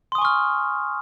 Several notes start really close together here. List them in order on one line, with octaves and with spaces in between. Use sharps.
C6 D#6 G#5 C#6 F6